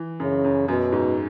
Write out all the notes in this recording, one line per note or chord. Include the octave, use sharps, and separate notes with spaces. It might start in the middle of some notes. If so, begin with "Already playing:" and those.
Already playing: E3
F#2 C#3
F#2
F#2 B2
G#2